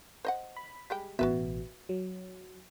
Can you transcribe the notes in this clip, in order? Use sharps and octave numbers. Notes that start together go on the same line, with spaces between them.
C5 D#5 F#5
B5
G3 G#3 G5
A1 B2 F#4 B4 E5
F#3